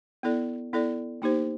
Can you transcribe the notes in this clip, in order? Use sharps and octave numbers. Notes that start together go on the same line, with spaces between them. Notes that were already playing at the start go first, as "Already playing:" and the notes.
B3 E4 A4 D5
B3 E4 A4 D5
A#3 D#4 G4 C5